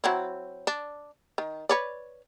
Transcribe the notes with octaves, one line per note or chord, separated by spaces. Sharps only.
F#3 C4 E4
D4
D#3
B4 C#5 D5